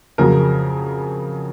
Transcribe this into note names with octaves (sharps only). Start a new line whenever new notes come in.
F2 C#3 F#3 A#4